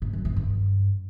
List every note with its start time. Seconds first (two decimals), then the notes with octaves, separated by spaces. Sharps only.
0.02 G#2
0.13 F#2
0.25 G#2
0.36 G2